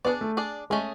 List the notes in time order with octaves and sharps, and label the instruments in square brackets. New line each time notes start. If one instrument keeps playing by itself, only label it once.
[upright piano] B3 [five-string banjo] D4 G#4 D5
[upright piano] A3
[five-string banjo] D4 G#4 D5
[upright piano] G#3 [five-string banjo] A3 C#4 G#4